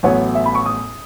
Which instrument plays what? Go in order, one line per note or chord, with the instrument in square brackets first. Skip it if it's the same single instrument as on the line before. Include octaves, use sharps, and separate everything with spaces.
[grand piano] A1 A2 F#3 B3 [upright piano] C#5
[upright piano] E5
B5
C#6
D#6